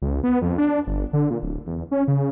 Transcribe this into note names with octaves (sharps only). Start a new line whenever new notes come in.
C#2
B3
F2
D4
G1
D3
A#2
D1
E2
C#4
C#3